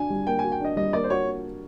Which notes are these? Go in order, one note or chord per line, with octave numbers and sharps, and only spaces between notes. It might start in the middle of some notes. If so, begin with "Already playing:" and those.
Already playing: D4 F#4 G#5
G3
A#3 G5
F#4 G#5
G5
D4 D#5
G3 D#5
A#3 D5
C5
F#4 C#5